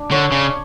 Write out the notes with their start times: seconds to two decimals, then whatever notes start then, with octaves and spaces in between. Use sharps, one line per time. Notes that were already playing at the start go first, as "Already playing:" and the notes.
Already playing: D4
0.11 D3 C#5
0.32 C#3